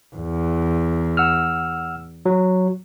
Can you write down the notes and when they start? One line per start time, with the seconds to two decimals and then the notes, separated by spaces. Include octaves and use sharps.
0.16 E2
1.17 F#5 E6 F6
2.26 F#3